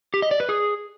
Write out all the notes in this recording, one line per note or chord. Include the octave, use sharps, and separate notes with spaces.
G4
D#5
D5
B4
G#4